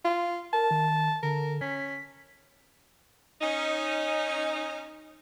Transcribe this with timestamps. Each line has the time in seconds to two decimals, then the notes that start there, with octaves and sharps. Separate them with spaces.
0.05 F4
0.53 A#4 A5
0.71 D#3
1.23 D3 A#4
1.61 C#4 B6
3.41 C#4 D#4